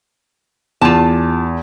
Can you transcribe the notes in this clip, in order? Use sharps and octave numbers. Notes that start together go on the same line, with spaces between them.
E2 F4 A5